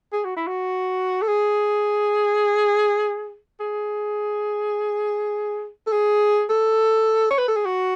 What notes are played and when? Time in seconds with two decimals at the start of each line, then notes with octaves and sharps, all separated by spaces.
0.13 G#4
0.25 F#4
0.37 E4
0.47 F#4
1.22 A4
1.28 G#4
3.60 G#4
5.87 A4
5.92 G#4
6.50 A4
7.31 C#5
7.38 B4
7.48 A4
7.56 G#4
7.65 F#4